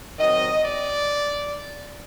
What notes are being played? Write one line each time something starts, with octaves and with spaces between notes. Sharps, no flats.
D#3 F#3 C4 D#5
D5